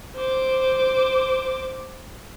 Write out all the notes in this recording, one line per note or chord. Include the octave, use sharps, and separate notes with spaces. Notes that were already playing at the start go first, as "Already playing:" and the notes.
C5 D6